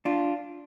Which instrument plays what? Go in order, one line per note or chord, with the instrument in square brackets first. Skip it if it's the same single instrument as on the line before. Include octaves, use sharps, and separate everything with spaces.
[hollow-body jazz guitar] D4 F4